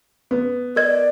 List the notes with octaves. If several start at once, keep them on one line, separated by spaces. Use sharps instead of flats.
B3
A#4 D5 D#5 G#6